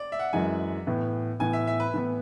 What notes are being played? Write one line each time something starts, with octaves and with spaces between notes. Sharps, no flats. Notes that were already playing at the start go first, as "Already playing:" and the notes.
Already playing: D5
E5
F#5
F#2 E3 G#3 G#5
A2 E3 B3
A2 E3 B3 G#5
E5
E5
B4
A2 E3 B3